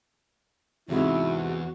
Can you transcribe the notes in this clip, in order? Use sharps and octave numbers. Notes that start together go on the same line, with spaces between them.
E2 G#2 C3 E4 F#4